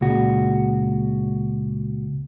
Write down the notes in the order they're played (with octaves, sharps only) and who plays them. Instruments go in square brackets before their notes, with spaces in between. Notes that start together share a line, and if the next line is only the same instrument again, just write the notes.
[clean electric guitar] C#2 A#2 F#4